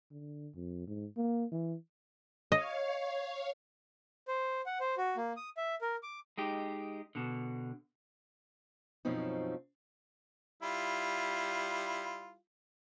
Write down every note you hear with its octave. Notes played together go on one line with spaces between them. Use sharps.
D3
F2
G#2
A#3
E3
C#5 D#5 F5
C5
F#5
C5
F#4
A#3
D#6
E5
A#4
D6
G#3 D#4 G4
B2 D3
F#2 B2 F3 C4 C#4 D#4
G3 E4 F4